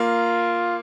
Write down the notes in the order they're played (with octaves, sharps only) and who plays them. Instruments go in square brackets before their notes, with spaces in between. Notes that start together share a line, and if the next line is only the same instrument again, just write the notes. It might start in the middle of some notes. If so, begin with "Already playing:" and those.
Already playing: [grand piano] A#3 [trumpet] F4